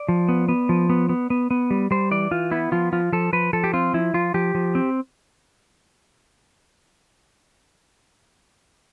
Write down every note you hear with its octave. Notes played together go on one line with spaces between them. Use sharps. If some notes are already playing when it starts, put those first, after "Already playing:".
Already playing: D5
F3
B3
B3
F3
B3
B3
B3
B3
G3
G3 C5
E3 D5
E3 F4
B3 E4
F3 F4
F3 F4
F3 A4
F3 B4
F3 A4
G4
C4 F4
F3 E4
F3 F4
F3 G4
F3
C4